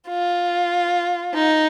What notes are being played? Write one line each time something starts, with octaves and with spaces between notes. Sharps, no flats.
F4
D#4